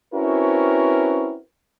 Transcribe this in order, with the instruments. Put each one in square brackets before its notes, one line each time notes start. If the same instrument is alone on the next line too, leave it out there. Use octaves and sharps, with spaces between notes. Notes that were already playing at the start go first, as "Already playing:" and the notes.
[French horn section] C4 C#4 E4 F#4 A#4 B4